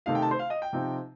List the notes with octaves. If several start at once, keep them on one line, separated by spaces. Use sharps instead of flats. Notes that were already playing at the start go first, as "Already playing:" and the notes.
C3 D#3 A3 C4 D#4 F5
G5
A5
C5
F5
D#5
G5
C3 F3 C4 D#4